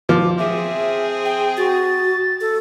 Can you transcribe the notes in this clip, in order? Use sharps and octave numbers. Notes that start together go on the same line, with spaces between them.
F3 D6
C4 G#4 E5
G5
F#4 A6
A4